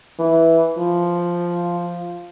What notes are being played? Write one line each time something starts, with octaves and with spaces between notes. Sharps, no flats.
E3
F3